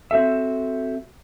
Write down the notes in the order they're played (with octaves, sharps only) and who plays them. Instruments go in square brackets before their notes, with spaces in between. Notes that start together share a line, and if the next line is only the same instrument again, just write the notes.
[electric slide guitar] C4 F#4 A4 E5